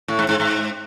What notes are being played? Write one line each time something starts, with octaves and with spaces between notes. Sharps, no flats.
A2
G#2
G#2
G#2